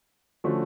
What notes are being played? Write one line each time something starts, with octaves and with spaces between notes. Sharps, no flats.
D3 F3 A3 C#4 F#4